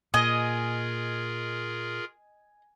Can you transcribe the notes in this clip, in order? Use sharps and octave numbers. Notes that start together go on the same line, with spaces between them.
A#2 F4 G#4 A#4 D#5 G#5